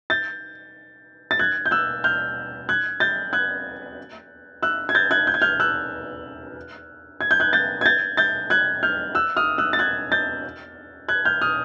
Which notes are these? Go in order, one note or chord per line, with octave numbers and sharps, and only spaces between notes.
G6 A6
A6
F#6 G#6
G6
E6 F#6
F6 G6
F#6 G#6
G6 A6
F#6 G#6
E6 F#6
G#6
G6 A6
F#6 G#6
G6
G#6
F6 G6
E6 F#6
G#6
G6
F#6 G#6
G6 A6
G#6
G6 A6
G6 A6
F#6 G#6
F6 G6
E6 F#6
D#6 F6
E6 F#6
A6
F#6 G#6
G6 A6
F#6 G#6
F6 G6
D#6 F6